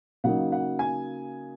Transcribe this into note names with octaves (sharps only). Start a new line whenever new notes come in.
C#3 F#3 A#3 D#4 F#5
F#5
G#5